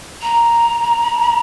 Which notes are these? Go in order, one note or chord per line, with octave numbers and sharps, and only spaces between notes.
A#5